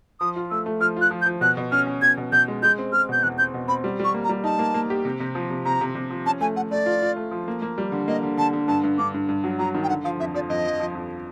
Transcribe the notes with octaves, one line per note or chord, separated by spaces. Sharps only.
F3 D#6
F4
A3 E6
A3
F3 F6
F4 F#6
F3
G6
F3
B2 F#6
B2
C#4 F6
C#4
B2 G#6
B2
B2 G6
G#3
G#3 G6
C4
G#3 F6
B2 G6
E2 F#6
C4 G6
B2
C4 B5
G3
G3 C#6
A#3
A#5
G3
D#4 A5
A#3
A#3
G4
C3
C3
F3
C3
C3 A#5
C3
C3
F3
C#4 A5
A3 G#5
A3 F#5
A3 D5
F4
F4
A3
F3
A#3
A#3
G3
D3
A#3 D#5
D3
D3 A5
D3
G2 A5
G2
G2 D6
G2
G2
F#3
F#3 A#5
D#3
G5
D3 F#5
F3 F5
F2 E5
F3 D5
F2 D#5
F3
F3
F2